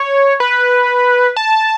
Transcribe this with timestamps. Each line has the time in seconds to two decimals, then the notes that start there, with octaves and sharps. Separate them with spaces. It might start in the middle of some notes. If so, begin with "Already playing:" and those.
Already playing: C#5
0.40 B4
1.37 A5